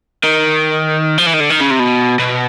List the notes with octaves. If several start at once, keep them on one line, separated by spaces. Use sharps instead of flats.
D#3
F3
E3
D#3
D3
D#3
C#3
C3
B2
B2